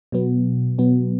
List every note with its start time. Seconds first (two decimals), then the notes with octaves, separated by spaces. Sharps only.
0.12 B2 F#3 B3
0.78 B2 F#3 B3